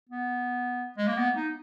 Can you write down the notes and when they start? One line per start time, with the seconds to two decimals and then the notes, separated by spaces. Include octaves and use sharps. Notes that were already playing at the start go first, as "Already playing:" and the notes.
0.09 B3
0.98 G#3
1.08 A#3
1.17 B3
1.36 D#4